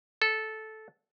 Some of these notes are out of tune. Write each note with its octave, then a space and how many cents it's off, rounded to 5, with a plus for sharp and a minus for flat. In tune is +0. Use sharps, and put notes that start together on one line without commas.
A4 -10